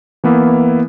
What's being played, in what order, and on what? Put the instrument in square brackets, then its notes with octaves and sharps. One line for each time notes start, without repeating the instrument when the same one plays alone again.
[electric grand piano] E3 A#3 B3 E4